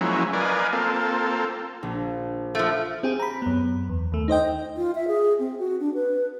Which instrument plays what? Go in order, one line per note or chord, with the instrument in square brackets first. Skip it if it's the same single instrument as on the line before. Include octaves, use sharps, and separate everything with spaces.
[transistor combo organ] F3 F#3 G#3 A#3 C#4 E4
A#4 B4 D5 D#5 F5 G#5
A#3 C4 F4 A4
[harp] A#1
[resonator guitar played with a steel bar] F3 A3
[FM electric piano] C4 G4 G#4
A#5 B5
F#2 B3
E2
D#2 A3
D#4 C5 D#5 G5
[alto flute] F4
E5
G#4
C4
F#4
D4
B4